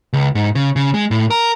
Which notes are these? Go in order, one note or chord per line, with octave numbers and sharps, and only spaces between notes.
C#2
G#2
C#3
C#3
G#3
A2
A#4